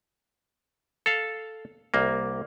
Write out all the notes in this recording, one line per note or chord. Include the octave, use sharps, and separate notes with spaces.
A4 F5
C2 A#3